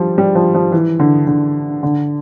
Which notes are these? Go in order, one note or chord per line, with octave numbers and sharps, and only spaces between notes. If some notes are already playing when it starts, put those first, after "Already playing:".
Already playing: F3 G3
G3
F3
F3
E3
D3
D3
D3